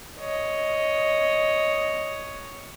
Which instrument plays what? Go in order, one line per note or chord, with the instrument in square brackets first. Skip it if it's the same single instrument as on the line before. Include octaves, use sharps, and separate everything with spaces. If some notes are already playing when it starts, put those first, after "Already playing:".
[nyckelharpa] C#5 D#5